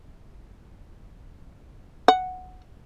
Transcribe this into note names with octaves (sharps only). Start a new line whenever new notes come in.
F#5